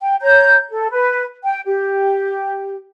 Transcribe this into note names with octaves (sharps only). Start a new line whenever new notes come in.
G5
C#5 A#5 G6
A4
B4
G5
G4